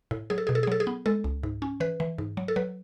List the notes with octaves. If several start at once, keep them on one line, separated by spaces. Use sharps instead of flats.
A2
F#3 G#4
A4
B2 G#4
A4
G#4
F#3 A4
G#4
B3
G#3 A4
C#2
G#2
C#4
E3 B4
E3
G#2
F#3
A4
F#3 B4